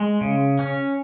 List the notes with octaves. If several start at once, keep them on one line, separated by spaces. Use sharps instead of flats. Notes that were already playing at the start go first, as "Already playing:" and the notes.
Already playing: G#3
C#3
C#4